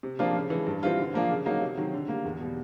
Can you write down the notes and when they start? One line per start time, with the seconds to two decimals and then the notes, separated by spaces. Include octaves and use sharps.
0.03 C3
0.19 F3 A#3 D4 F4
0.35 C#3
0.50 E3 G#3
0.67 G2
0.83 E3 G3 C4 F4
0.98 D3
1.14 F3 A#3 D4 F4
1.30 C#3
1.46 F#3 A#3 D#4
1.61 C3
1.77 D#3 F#3
1.94 D3
2.08 G3 A#3
2.25 E2
2.41 B2 G3